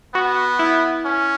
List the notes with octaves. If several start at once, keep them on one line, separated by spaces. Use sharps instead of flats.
B3 F#4
E4
C#4